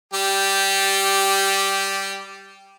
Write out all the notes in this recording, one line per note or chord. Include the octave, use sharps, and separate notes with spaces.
G3 G4